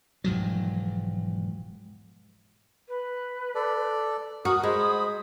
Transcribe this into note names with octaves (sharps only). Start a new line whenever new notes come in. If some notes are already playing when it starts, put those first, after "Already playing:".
E1 G#2 F3 F#3
B4
A4 D5
F#4 A#4 D#6
G#3 C5 B5